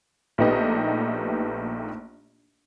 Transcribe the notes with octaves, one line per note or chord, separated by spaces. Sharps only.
A#1 A3 B3 D#4 G4 D#5